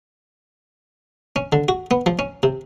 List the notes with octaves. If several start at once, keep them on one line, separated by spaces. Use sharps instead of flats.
C#4
D3
F#4
B3
F3
C#4
C3